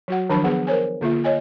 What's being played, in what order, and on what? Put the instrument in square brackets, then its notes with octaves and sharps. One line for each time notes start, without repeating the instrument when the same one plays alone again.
[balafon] F#3 F#4 F#5
D#3 F3 F#3 D4 A5 B5
B3 G#4 B4 F#5
A#4 C5 C#5 G#5
D3 A#3 F4 E5
C#5 D#5 G#5